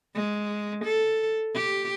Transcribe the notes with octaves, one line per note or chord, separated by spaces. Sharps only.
G#3
A4
G4